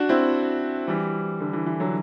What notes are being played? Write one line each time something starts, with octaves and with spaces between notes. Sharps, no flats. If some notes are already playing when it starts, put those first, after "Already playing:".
Already playing: D4 F#4
C4 E4
E3 G3
D3
E3
E3
D3 F#3